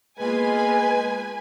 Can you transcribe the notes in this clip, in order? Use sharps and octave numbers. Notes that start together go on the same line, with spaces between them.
G#3 A#3 B3 F4 B4 G#5